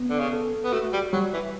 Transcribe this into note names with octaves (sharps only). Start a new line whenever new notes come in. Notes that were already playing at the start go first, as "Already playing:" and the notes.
Already playing: B3
D3
C#3
A4
B3
A3 F#4
G3
F#3 G3
E3